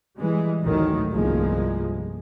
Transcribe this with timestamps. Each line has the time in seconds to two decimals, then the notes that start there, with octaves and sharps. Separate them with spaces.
0.17 E3 G3 G#3
0.61 A1 D2 A2 D3 D#3 F#3
1.12 G1 C2 F3 G#3 A#3